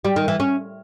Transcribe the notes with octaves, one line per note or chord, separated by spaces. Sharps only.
G3
D#3
E3
C#4